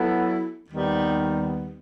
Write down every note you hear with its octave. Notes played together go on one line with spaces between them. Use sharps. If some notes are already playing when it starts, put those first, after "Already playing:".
Already playing: F#3 B3 E4 A4
D#2 D#3 G3 B3 D#4